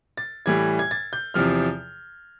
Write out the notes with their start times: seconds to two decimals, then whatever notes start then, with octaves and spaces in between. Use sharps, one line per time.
0.17 A6
0.46 A2 E3 G3 G#6
0.79 G#6
0.91 A6
1.13 G6
1.34 E2 C3 F3 F6